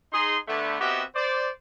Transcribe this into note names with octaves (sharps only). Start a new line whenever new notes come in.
D#4 G#4 C6
D3 A3 B3
B3 C4 F#4 G4 D#5 E5
C5 D5